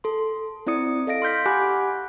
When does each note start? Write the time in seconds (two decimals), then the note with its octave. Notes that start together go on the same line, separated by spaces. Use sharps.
0.04 A4 C6
0.67 C4 E4 D5 D#6 C#7
1.07 A4 D#5 F5 A#6 D7
1.22 C6 F6 G6 B6
1.46 G4 F#5 G#5 B5 D6 F#6